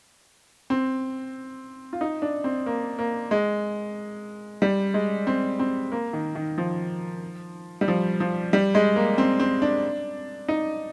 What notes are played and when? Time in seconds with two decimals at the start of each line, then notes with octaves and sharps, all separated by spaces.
0.70 C4
1.93 F4
2.01 D#4
2.22 D4
2.44 C4
2.66 A#3
2.99 A#3
3.31 G#3
4.62 G3
4.94 G#3
5.27 C4
5.59 C4
5.92 A#3
6.13 D#3
6.35 D#3
6.58 F3
7.81 G3
7.88 F3
8.20 F3
8.53 G3
8.75 G#3
8.96 A#3
9.18 C4
9.40 C4
9.62 D4
10.48 D#4